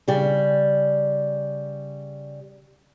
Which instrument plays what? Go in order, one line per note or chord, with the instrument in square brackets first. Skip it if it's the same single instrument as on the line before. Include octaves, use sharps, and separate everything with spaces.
[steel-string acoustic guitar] C#3 G3